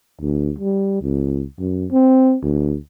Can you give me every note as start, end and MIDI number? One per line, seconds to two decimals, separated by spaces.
0.21 0.52 38
0.58 0.98 55
1.02 1.43 37
1.59 1.86 42
1.91 2.36 60
2.42 2.75 38